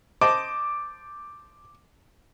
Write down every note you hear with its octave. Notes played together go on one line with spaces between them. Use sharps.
C5 D#5 A5 D6